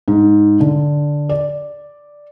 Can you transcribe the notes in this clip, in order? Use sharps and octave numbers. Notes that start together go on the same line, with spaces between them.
G#2
D3
D5